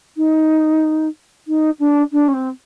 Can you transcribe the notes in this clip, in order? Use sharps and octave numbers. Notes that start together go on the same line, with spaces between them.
D#4
D#4
D4
D4
C#4
C4